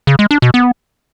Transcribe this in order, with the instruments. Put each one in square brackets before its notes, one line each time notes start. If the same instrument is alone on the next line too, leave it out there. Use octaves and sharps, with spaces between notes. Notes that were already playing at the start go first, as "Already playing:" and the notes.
[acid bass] C#3
G#3
D4
B2
B3